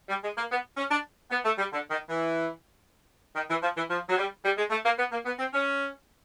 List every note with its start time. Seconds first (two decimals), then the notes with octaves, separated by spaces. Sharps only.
0.09 G3
0.23 G#3
0.37 A#3
0.50 B3
0.77 C#4
0.91 D4
1.31 B3
1.45 A3
1.58 G3
1.72 D3
1.90 D#3
2.09 E3
3.35 D#3
3.49 E3
3.62 F3
3.76 E3
3.89 F3
4.09 F#3
4.17 G3
4.44 G3
4.57 G#3
4.70 A3
4.84 A#3
4.98 B3
5.11 A#3
5.25 B3
5.39 C4
5.53 C#4